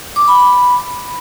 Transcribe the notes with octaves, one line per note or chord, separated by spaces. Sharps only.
D6
B5
B5